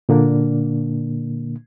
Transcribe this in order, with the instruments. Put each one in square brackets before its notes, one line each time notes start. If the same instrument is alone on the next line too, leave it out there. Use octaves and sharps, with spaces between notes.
[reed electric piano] A#2 D3 A#3 D4